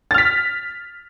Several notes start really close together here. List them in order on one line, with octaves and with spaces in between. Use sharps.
A6 F6 B6